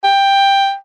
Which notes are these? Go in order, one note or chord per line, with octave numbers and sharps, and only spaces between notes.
G5